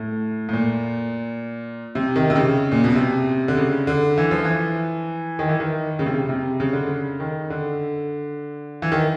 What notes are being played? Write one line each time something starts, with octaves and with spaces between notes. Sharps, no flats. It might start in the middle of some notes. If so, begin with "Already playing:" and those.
Already playing: A2
A2
A#2
C3
D#3
C3
C#3
A#2
B2
C3
D3
C#3
D3
E3
F3
E3
D#3
E3
D#3
C#3
C3
C#3
C3
C#3
D3
C#3
D#3
D3
E3
D#3